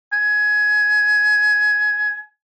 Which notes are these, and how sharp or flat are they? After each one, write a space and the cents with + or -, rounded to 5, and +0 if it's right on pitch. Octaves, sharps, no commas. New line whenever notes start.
G#5 +20